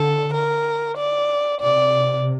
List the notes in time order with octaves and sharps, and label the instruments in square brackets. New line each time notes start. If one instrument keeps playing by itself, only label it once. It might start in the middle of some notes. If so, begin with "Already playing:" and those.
Already playing: [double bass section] D3 [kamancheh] A4
[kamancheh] A#4
D5
[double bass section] C3 [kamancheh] D5